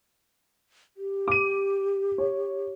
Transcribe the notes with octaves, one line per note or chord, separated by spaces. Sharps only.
G4
D6 D#7
C#5